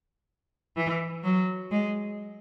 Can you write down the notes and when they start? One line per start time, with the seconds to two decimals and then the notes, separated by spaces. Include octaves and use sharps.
0.77 E3
1.24 F#3
1.71 G#3